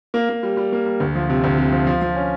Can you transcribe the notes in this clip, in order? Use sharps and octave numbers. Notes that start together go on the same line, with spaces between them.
A#3
A#3
G3
G3
A#3
G3
D2
F3
C3
D2
C3
F3
F3
F3
C#4